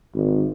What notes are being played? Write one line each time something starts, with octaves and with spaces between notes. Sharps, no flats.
G#1